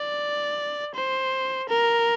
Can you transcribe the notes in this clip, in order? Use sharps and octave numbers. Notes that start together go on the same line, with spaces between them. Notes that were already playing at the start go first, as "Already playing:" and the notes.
Already playing: D5
C5
A#4